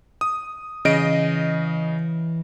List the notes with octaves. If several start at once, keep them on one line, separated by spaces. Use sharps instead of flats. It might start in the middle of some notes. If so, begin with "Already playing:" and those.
D#6
C#3 E3 D#5 D7